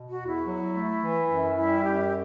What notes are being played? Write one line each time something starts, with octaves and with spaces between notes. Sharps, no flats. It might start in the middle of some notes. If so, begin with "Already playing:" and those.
Already playing: B2
F#4
E2
E4
F#3
A3
E3
F#2
G3 E4
F#2 G4